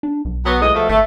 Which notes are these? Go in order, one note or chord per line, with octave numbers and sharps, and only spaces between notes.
D4
B1
F#3 B3
A2 G#3 D#5
B2 F3 A3
G#1 A3